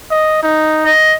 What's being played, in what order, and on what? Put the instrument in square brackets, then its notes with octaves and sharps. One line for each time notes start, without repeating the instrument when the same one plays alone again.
[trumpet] D#5
D#4
[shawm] D#5